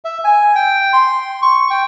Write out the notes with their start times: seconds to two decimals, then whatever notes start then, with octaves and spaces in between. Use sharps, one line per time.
0.05 E5
0.24 G#5
0.55 G5
0.93 C6
1.42 C#6
1.70 G5